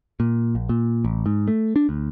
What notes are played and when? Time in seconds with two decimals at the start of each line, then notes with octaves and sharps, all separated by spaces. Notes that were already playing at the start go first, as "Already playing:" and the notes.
0.20 A#2
0.55 A#1
0.69 A#2
1.05 A1
1.26 G#2
1.48 A3
1.76 D4
1.89 D2